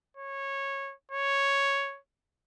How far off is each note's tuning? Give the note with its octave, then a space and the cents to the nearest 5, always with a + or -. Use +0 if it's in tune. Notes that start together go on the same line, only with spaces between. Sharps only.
C#5 -15
C#5 +0